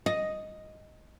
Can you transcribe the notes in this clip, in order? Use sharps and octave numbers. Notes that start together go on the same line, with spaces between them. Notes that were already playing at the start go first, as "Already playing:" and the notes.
D#5